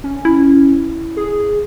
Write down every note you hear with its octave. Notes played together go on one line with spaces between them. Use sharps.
C#4
E4
G#4